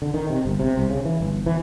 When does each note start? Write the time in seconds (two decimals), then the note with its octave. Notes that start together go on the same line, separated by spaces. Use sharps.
0.02 D3
0.14 D#3
0.30 C3
0.45 G1
0.59 C3
0.77 C2
0.90 C#3
1.05 E3
1.20 G1
1.46 E3